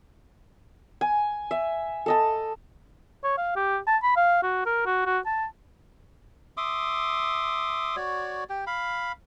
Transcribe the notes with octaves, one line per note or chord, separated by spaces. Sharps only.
G#5
E5
A4 D#5 A5
C#5
F5
G4
A5
B5
F5
F#4
A#4
F#4
F#4
A5
E5 C6 D6 D#6
F#4 C#5 D5
G4 G5
F5 B5